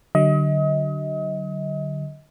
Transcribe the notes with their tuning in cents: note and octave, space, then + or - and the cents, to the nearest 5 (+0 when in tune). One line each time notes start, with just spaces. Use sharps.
D3 +10 F#3 +35 D#5 +35